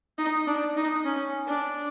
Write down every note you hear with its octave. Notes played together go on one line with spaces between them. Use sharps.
D#4
D4
D#4
C#4
D4